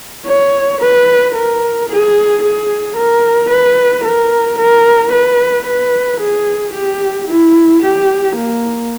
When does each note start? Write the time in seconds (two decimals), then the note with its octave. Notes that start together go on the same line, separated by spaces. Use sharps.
0.26 C#5
0.81 B4
1.35 A#4
1.89 G#4
2.42 G#4
2.96 A#4
3.50 B4
4.04 A#4
4.58 A#4
5.12 B4
5.66 B4
6.20 G#4
6.73 G4
7.27 E4
7.82 G4
8.36 A#3